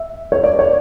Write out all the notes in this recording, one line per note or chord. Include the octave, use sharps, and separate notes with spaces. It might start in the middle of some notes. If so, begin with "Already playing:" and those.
Already playing: E5
C#5
D5
C#5